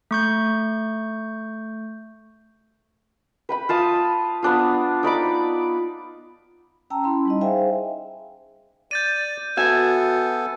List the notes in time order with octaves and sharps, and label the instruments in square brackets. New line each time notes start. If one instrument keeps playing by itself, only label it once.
[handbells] A3 C#6 G6
[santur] B4 G5 B5
F4 A5 D#6
B3 D4 F4
D#4 D5 B5 D6
[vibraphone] C#4 G5 A5 A#5 E6
C#4 E4 B5 C6
G3 D#4 D#5
G#4 C5 E5 F5 G5 G#5
[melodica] D5 [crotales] G6 A6 D#7
[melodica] B3 A4 [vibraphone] F#4 [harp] E5 G#5